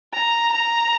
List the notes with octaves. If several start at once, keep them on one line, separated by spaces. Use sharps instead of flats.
A#5
A#5